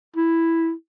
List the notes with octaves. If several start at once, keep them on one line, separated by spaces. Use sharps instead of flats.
E4